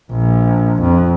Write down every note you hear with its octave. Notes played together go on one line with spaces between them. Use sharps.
A#1
F2